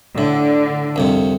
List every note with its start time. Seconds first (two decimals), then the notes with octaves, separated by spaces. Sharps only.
0.18 A2 D3
0.96 C2 F2 C3